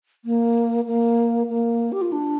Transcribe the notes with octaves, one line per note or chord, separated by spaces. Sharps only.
A#3
A#3
A#3
G4
F4
D4